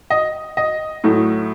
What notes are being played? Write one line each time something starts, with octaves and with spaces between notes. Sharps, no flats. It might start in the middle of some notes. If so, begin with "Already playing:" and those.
D#5
D#5
A2 F#3 A3